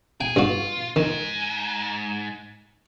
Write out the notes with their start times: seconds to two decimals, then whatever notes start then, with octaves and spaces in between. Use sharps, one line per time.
0.21 G#4 G5
0.36 G2 F4 F#4
0.96 G#2 D#3